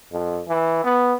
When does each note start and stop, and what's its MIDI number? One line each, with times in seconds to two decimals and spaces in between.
0.12 0.41 41
0.48 0.79 52
0.84 1.14 59